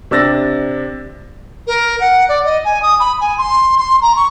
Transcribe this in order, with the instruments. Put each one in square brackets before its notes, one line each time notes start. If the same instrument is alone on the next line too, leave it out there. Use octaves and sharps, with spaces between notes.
[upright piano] C3 D4 E6 A6 A#6
[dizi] A#4
F#5
D5
D#5
G#5
D#6
B5
G#5
C6
C6
A#5
C#6